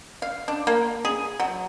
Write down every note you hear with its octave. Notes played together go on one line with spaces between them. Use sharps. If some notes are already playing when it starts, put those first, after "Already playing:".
F5
D4
A#3
G#4
F#3